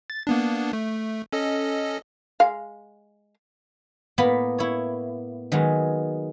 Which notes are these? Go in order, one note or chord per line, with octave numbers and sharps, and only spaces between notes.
A6
A#3 B3 D4
A3
C#4 A4 D#5
G#3 F5
A2 A#3 B3 B5
E4 C#5
D#3 F#3 G#3 B3